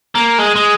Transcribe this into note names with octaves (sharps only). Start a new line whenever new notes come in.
A#3
G#3
G#3